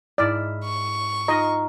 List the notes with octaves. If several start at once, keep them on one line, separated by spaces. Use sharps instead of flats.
G#2 E4 D5 F6
C#6
D#4 F4 D#5 A#5